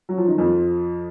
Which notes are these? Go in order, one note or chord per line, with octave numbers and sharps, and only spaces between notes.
F#3
F3
D#3
F2 F3